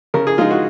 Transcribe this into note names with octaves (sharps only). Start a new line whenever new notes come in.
C#3 A#4
G#4
G#3 D#4 F4
F#4